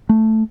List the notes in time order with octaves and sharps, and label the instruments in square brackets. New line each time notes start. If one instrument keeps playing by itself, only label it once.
[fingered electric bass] A3